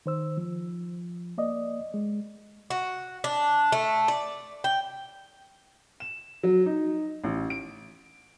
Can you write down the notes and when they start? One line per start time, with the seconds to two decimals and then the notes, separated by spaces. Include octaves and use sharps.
0.06 D#3 C5 E6
0.37 F3
1.38 A#3 D5 D#5
1.94 G#3
2.70 F#4
3.24 D4
3.72 A3
4.08 D5
4.64 G5
6.00 E7
6.43 F#3
6.66 D#4
7.24 A1
7.50 D7